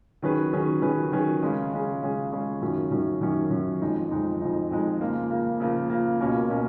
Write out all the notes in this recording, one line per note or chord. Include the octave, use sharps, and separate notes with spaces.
D#3 F#3 C#4 G#4 B4
D#3 F#3 C#4 G#4 B4
D#3 F#3 C#4 G#4 B4
D#3 F#3 C#4 G#4 B4
C#3 G#3 C#4 G#4
C#3 G#3 C#4 G#4
C#3 G#3 C#4 G#4
C#3 G#3 C#4 G#4
F#2 D#3 F#3 C#4
F#2 D#3 F#3 C#4
F#2 D#3 F#3 C#4
F#2 D#3 F#3 C#4
F2 F3 G#3 D#4
F2 F3 G#3 D#4
F2 F3 G#3 D#4
F2 F3 G#3 D#4
C#3 F3 A#3
C#3 F3 A#3
C#3 F3 A#3
C#3 F3 A#3
C#2 B2 A#3 C#4
B2 A#3 C#4